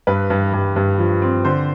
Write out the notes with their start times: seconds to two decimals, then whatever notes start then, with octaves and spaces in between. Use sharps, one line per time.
0.07 G2 B4
0.30 G2
0.53 G2
0.76 G2
0.99 F3
1.22 C4
1.45 D3 C5